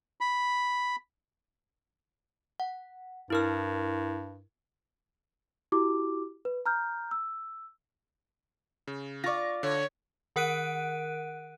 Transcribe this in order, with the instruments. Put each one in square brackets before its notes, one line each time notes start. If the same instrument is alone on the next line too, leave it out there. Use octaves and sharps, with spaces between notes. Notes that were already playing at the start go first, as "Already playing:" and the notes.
[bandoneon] B5
[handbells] F#5
[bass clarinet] G2 [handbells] E4 A#4 F6
[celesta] E4 F#4 G4 D6
B4
A#5 F6 G6
E6
[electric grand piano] C#3
[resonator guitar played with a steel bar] F4 D5 [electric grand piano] C#6 A#6
[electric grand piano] D3 [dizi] C#5
[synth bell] D#3 A#4 F#5 F#6 D7 D#7